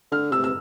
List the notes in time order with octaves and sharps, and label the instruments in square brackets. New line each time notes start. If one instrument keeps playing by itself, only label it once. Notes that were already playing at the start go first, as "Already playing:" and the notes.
[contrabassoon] D3 [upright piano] F6
[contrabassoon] C3 [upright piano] E6
[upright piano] E6